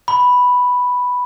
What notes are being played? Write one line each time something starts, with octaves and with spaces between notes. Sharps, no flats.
B5